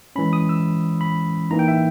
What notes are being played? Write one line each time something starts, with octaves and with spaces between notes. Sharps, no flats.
E3 G#3 C#4 B5
D#6
E6
B5
E3 A#3 D#4 A#5
G5
E5